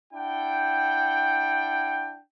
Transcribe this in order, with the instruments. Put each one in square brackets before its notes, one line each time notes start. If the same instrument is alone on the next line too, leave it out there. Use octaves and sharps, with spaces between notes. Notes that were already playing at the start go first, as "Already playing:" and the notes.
[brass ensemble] D4 E4 F#5 G5